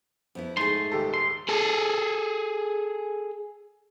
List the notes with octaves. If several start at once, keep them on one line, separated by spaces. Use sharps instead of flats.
F2 B3 E4
G#2 A3 D#4 G#4 C6
D#1 G4 A4
C6
G#4 A4